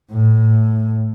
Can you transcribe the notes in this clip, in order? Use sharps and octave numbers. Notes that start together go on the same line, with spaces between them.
A2